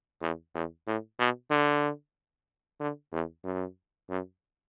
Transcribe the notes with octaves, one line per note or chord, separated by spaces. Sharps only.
E2
E2
A2
B2
D3
D3
E2
F#2
F#2